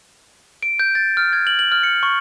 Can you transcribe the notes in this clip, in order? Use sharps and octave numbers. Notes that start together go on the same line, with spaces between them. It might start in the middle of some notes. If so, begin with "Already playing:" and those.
D7
G6
A6
F6
G#6
F#7
F#7
F6
C#7
C#6